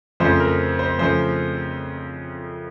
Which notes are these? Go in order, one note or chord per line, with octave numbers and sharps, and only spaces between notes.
F2 C#3 F3 A3 C5
A#4
C5
F2 C#3 F3 A3 C5